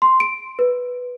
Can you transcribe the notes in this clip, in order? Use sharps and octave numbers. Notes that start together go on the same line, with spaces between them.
C6
D7
B4